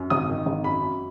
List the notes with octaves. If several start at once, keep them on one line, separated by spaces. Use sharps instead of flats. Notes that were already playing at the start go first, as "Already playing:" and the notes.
Already playing: F#2
G#1 D#6
D#3
G#1
F#2 B5
F#2